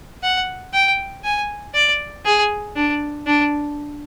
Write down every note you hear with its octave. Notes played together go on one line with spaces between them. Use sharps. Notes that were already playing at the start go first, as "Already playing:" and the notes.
F#5
G5
G#5
D5
G#4
D4
D4